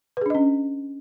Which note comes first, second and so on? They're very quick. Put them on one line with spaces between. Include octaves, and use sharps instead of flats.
B4 G#4 D4 D#5 C#4